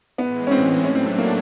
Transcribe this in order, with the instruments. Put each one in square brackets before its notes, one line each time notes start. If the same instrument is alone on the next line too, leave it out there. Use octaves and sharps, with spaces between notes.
[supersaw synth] A2 E3 G#3 [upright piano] B3
[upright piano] C#4
C4
[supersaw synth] A2 F#3 A3 D4 [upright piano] C#4
[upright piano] C4
C4
A#3